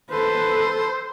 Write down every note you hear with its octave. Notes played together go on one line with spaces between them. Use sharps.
A4 B4 C5